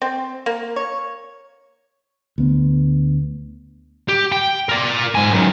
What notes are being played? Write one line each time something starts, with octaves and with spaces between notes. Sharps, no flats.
C4
A#3
C#5
D2 B3
G4
G5
A#4 D5
G#2 G#5
F#2 D#3